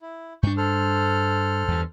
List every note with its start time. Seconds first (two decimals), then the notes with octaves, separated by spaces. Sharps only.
0.01 E4
0.43 G2 D4 C#6 G6
0.57 A4 C5 F6
1.68 E2 G2